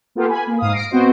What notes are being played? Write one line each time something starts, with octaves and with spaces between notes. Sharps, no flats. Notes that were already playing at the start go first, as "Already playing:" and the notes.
A#3 B3 F4 G4 A4 B4
G#5 B5
A#3
G#2 F5 D#6
A#6 C7 D7
B3 C4 F#4 C5 D#5